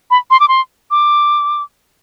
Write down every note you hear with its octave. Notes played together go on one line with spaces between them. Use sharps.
B5
C6
D6
C6
D6